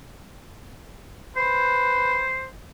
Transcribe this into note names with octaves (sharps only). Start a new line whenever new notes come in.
B4 C5